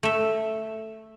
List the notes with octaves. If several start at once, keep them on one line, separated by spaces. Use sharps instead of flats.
A3 E5